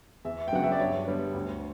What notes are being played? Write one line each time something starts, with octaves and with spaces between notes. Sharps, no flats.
E2 E5
G5
C#3 F#3 B3 D4 F#5
E5
D5
G2 C#5
D3 G3 B3
D2